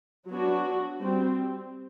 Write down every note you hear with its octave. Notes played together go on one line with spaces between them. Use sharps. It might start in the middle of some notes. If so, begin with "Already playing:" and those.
F#3 B3 D4 F#4
G3 C4